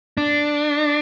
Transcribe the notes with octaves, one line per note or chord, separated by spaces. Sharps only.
D4